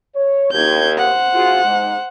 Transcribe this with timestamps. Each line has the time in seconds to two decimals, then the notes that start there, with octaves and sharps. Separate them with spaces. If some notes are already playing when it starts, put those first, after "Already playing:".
0.15 C#5
0.52 D#2 G6 G#6
0.98 C5 F#5
1.34 F4 F#4 G#4
1.63 G#2